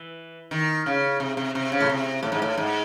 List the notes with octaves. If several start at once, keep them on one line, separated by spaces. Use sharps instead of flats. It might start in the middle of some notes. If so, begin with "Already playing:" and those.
Already playing: E3
D#3
C#3
C3
C3
C3
C#3
A2
C3
A2
G#2
A2
G#2